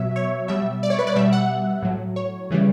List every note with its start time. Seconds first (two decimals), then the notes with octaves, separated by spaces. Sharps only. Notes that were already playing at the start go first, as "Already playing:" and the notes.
Already playing: B2 F#3 E5
0.16 C#5
0.48 B2 G3 E5
0.83 D5
0.90 C#5
0.99 B4
1.07 D5
1.15 B2 G3 E5
1.33 F#5
1.82 A2 F#3
2.16 C#5
2.50 C#3 E3 G3